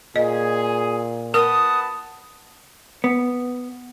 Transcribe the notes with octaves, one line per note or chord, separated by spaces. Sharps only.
A#2 G#4 D#5
A#4 B4 F#5 A5 D#6
B3